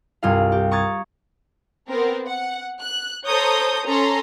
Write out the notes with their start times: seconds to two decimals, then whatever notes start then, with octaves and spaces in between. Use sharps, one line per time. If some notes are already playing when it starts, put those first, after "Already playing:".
0.23 C2 G2 F4 G#4 F5
0.52 G4
0.71 A#5 C#6 D#6 G#6 A6
1.89 B3 C4 A#4
2.27 F#5
2.81 F#6
3.27 A4 C5 C#5 A#5 D#6 G6
3.87 C#4 A4 A#5 C6